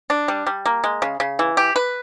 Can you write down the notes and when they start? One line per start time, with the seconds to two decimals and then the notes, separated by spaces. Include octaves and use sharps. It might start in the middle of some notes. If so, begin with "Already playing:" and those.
0.10 D4
0.28 G3
0.46 G3
0.66 A#3
0.84 G#3
1.02 C#3
1.20 C#3
1.39 E3
1.57 G4
1.76 B4